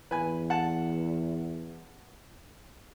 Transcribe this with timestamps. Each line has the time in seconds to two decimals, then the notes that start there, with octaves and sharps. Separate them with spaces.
0.11 E2 B4 G#5
0.50 F#5 A5